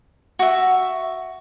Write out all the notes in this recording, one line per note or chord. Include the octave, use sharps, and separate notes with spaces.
F#4 E5